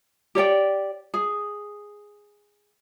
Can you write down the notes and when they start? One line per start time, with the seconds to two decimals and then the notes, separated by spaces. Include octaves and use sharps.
0.35 G4 C#5 D5 G5
1.14 G#4